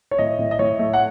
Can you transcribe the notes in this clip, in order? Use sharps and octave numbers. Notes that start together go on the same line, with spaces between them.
C#5
A2 D#5
A2
D#5
A2 C#5
A3
F#5